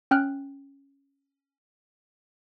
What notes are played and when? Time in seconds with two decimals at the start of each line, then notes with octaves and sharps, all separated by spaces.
0.11 C#4 G5 F6 F#6